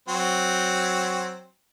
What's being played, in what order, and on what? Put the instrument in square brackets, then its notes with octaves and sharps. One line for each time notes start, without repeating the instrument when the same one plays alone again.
[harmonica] F#3 C4